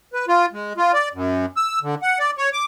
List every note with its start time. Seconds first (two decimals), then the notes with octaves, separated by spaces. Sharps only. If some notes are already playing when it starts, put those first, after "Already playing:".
0.13 B4
0.28 F4
0.53 G#3
0.77 F4
0.94 D5
1.14 F#2
1.57 E6
1.82 D3
2.02 F#5
2.20 D5
2.38 C#5
2.53 D6